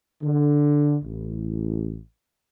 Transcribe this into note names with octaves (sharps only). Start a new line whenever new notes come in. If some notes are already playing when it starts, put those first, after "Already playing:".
D3
A1